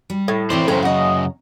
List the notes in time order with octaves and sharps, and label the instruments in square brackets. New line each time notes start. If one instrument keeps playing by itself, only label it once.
[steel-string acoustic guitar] G3
[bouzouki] A2
[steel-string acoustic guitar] E3 C4 E4 [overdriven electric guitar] C5 D5
[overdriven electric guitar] F#2 C#3 [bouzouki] A2 C4 [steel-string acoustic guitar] C#4 A#5
[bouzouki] F#4 D#5